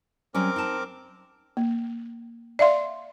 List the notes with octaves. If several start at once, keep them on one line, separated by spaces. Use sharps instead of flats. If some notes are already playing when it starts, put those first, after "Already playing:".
F#3 G3 C4 C#4 A#4 D6
D#4 A5
A#3
D5 E5 F5 C6